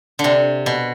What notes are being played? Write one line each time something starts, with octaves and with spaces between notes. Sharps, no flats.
D3
C3
B2